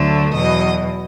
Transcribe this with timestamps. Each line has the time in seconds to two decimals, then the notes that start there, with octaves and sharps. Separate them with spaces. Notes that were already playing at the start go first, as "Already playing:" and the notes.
Already playing: D2 D3 F#3 A3
0.32 E2 B2 F#3 D#5